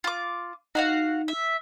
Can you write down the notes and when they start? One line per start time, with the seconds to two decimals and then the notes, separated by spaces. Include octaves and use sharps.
0.04 F4 D6
0.75 D#4 F#4 F5 F#5
1.28 E5